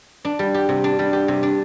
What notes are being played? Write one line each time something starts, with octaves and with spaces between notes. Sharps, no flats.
D4
G3
G4
C3
D4
G3
G4
C3
D4